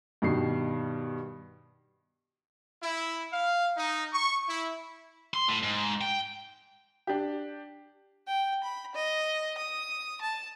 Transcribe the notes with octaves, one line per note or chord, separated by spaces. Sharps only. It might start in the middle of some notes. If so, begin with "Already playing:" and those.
G2 B2 D#3 C7
E4
F5
D#4
C#6
E4
C6
A2
G#2
G5
D4 G4
G5
B5
D#5
D#6
A5